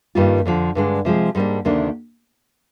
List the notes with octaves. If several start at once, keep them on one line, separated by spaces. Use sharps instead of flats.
G2 D#3 G3 A#3 F4
F2 D3 F3
G2 D3 G#3
C3 F3 G#3
G#2 G3 A#3 D4
D2 C3 D#3 A#3 D4